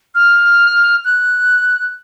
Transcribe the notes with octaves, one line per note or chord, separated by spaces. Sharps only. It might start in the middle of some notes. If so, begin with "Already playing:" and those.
F6
F#6